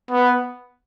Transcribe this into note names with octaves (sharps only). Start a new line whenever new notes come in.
B3